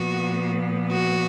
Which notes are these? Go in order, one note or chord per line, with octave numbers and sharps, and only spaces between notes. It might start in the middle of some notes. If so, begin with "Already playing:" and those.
Already playing: A#2 F3 B3 F#4
F#4